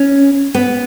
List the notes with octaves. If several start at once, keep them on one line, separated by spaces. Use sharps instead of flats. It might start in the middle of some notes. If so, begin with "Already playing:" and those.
Already playing: C#4
B3